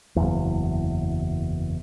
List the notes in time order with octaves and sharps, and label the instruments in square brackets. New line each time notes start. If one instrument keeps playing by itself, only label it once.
[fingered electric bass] F#1 E2